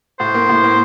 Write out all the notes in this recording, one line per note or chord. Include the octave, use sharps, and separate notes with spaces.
A2 C5
A#3
A2
A#3